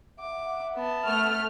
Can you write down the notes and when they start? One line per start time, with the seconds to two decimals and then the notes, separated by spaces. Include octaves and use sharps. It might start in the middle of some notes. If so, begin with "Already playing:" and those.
0.20 E5 F#5 D6
0.77 B3 A5
1.06 A3 F6